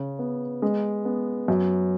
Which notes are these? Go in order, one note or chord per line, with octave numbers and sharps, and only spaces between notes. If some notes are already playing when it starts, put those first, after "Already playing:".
Already playing: C#3
B3
G#3
B3
F#2